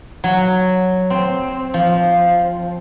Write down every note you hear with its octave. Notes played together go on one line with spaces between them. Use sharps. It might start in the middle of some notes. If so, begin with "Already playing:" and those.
F#3
C4
F3